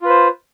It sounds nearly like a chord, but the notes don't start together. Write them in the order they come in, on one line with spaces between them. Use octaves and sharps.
F4 B4 C5